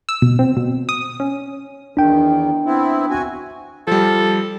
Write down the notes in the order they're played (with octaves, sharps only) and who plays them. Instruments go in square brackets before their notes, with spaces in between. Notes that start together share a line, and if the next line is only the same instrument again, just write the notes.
[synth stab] E6
B2
C4
B2
D#6
C#4
[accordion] E2 D#3 [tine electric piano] D4 G5
[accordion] B3 C4 E4
F#4 G#5
[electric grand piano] F3 G3 [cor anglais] A4